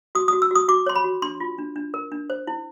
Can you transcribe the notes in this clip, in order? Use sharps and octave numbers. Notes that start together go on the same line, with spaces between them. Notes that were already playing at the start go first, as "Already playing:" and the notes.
F#4 D#6
D#6
F#4
E6
F#4 D#6
F#4 D6
C#5 C6
B5
F#4
D4 C6
F4
D4
D4
A#4
D4
C5
E4